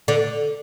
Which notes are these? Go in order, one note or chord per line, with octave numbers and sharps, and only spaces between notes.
D3